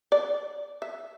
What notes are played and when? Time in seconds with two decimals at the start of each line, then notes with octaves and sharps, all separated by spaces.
0.12 D5
0.82 E5